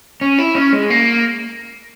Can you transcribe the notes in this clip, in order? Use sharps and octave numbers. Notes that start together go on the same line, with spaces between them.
C#4
E4
C#4
G#3
A#3